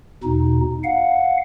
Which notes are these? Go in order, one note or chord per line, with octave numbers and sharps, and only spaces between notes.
E2 B2 D#4
F5 F#5